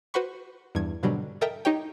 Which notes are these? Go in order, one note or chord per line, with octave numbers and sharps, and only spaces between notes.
F#4 B4 C5 F#5 B5 C#6
E2 G2 G#6
G#2 B2 D3 F#3 G3
A4 A#4 D#5 E5 G5
D#4 G4 C#5 G5